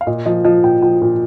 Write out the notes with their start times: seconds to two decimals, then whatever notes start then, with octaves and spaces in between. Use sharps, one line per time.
0.01 F5
0.07 A#2 D#5
0.26 F3 D#5
0.45 F3 D#5
0.64 A#2 G5
0.82 F3 G5
1.02 A#2